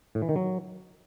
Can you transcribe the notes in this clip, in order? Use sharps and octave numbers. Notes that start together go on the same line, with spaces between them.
A2
E3
D#3
F#3